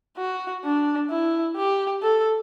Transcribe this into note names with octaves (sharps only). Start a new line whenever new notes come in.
F#4
D4
E4
G4
A4